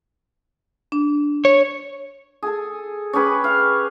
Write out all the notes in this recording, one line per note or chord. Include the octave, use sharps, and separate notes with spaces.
D4
C#5
G#4 A4
C#4 G4 G#4 B4
F5